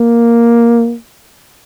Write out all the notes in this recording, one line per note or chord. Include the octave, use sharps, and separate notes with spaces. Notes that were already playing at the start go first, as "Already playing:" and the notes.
Already playing: A#3